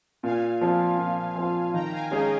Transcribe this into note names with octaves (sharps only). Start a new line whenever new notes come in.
A#2 F5 G#5
F3 C4 F4
A#2
F3 C4 F4
D#3 G5 A#5
F5 G#5
G#3 C#4 G#4 D#5 G5